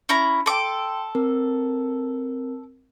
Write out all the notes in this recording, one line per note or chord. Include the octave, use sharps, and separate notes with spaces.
C#4 E4 A#5
A4 G5 C6 D6
C4 A#4